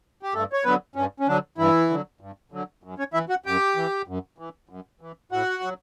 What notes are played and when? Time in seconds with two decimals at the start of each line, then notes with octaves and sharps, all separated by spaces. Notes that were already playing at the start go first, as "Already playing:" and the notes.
0.23 G4
0.34 G2 A3 A4
0.53 C#5
0.64 D3 F#3 B3 B4
0.96 G2 C#4
1.20 C#4
1.28 D3 F#3 D4
1.58 G2 E3 E4
1.90 D3 F#3
2.21 G2
2.52 D3 F#3
2.83 F#2
2.98 C#4 C#5
3.14 E3 E4 E5
3.29 F#4 F#5
3.46 F#2 G4 G5
3.76 E3
4.08 F#2
4.38 E3
4.69 F#2
5.01 E3
5.32 A2 F#4 F#5
5.63 F#3